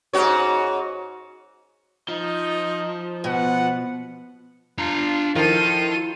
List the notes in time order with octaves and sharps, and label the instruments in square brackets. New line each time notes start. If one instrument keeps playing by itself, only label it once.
[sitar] G#2 F#4 C#5
[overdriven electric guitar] F3 [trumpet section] D#4
[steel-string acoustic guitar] B2 [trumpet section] B4 F#5
[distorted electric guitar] D4 A#5 [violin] F4
[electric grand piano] D#3 F3 [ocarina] E4 [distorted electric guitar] F4 [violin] A4 D#7